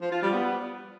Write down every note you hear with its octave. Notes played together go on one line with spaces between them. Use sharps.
F3
F4
G3
B3